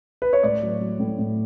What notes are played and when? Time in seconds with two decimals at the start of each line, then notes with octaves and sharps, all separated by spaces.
0.22 B4
0.33 C#5
0.43 A2 D5
0.62 F#3
0.81 F#3
1.00 A2
1.19 A2